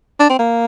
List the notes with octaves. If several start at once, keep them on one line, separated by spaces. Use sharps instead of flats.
D4
C4
A#3